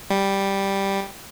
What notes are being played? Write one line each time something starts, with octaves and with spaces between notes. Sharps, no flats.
G3